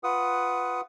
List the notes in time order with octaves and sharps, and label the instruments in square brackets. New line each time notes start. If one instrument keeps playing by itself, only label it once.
[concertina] F4 B4 F#5 D#6